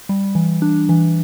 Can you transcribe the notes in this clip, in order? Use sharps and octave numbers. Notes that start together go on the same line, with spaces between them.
G3
E3
D4
E3